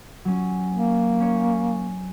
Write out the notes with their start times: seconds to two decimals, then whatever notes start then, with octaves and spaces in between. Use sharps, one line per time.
0.25 F#3 C#4
0.73 A#3
1.20 C#4 C#5